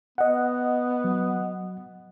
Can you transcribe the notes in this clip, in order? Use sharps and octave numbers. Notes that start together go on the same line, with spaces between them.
B3 D#5 F#5
F#3